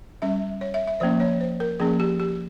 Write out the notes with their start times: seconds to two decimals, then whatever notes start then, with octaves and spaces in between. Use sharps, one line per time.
0.22 G3 C#4 E5
0.61 C#5
0.74 E5
0.87 E5
1.00 F3 A#3 C#4 C5
1.20 C#5
1.40 C5
1.60 A#4
1.80 F3 A#3 C#4 G#4
2.00 G4
2.20 G4